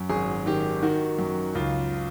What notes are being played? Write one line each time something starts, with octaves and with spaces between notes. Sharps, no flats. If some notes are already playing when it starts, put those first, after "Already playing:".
Already playing: F#2
G#1 G#4
D#3 G4
D#3 F#4
F#2
C#2 F4